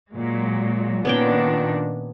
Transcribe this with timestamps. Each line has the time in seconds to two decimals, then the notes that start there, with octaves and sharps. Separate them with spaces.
0.12 A#2 F#3 G#3
1.05 A#2 D#3 B3 C#4 D4 G5